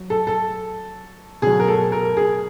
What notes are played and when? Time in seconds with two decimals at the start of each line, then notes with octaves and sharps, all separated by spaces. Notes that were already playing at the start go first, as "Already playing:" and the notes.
Already playing: F#3
0.10 A4
0.27 A4
1.42 B2 F#3 G#4
1.60 A#4
1.68 A4
1.92 A#4
2.17 G#4